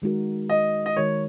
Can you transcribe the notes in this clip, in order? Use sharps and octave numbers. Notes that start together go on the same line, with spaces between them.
D#3 G#3 D#4 F#4 A#4
D#5
D#5
D#3 G#3 D#4 F#4 A#4 C#5